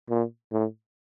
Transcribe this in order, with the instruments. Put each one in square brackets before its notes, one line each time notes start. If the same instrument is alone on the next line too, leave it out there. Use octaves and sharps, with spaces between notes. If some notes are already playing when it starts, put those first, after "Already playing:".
[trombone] A#2
A2